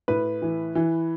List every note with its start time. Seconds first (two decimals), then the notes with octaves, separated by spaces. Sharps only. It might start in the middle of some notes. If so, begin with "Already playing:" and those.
0.08 A2 B4
0.42 E3
0.75 E3